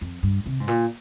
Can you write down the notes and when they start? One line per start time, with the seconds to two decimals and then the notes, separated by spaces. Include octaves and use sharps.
0.01 F2
0.23 G2
0.46 C3
0.60 G#2
0.68 A#2